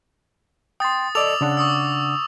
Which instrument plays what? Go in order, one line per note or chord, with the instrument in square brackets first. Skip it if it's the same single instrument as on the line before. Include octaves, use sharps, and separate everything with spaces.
[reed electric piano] G5 C6 [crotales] D#6 A6
[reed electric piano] A4 D5 D#5 [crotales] D6 E6 F7
[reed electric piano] C#3 D4 F#5
[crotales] C#6 D#6 E6